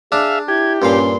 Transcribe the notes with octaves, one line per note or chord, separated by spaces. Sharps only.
D4 G#4 E5 F5
E4 G4 G#6
G2 A#2 C#4 F5 C6